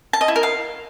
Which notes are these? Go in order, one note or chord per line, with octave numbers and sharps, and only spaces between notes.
A5
D#5
E4
A#4
F5